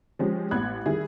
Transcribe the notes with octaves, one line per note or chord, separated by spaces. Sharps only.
F3 G#3 C#4 G4
A1 B3 B5 F#6 G#6
D#3 G3 E4 G#4